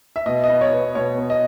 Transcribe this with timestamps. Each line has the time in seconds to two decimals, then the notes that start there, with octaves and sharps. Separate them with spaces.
0.16 E5
0.26 B2 D#5
0.44 D#5
0.49 B3
0.61 C#5
0.72 B3
0.95 B2 C#5
1.18 B3
1.30 D#5